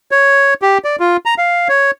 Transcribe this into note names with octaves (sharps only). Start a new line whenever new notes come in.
C#5
G4
D5
F4
A#5
F5
C#5